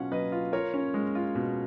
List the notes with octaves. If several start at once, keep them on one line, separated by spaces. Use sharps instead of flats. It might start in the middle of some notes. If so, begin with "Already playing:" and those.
Already playing: B2 F#3 C#4 F4 F5 F#5
F#3 B4 D#5
F4
F4 A#4 C#5
C#4
G#3
F4
B2